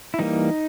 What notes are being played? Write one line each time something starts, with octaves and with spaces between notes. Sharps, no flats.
E4
E3 G3 A#3 D#4